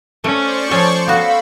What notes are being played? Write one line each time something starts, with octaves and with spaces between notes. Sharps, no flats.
A3 C#4 C5 D5 C#6
F3 C#4 A4 C#5
B3 F#4 A4 F5 B5 E6